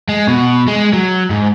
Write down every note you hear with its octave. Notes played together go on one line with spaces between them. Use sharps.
G#3
B2
G#3
F#3
G#2